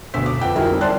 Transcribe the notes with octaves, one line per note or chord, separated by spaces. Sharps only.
D2 B2 E6 B6
D6
F2 B4 F#5 G5
D3 F3 E4 F#4 G#4 A#4
G3 C4 D#4
A#4 C5 D5 A5 C6 F#6